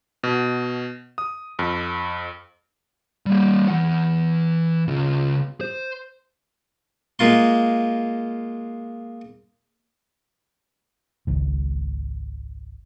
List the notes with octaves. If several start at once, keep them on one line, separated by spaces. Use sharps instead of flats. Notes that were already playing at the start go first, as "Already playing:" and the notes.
B2
D#6
F2
G3 A#3
E3 F#5
C#3 F4
C5
G#3 A#3 F4 C6
G#1 C#2 G#2